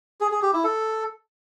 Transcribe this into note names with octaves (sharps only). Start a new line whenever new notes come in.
G#4
G#4
G4
E4
A4